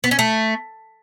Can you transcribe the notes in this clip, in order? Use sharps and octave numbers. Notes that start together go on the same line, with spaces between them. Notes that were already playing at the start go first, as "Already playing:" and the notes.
B3
C#4
A3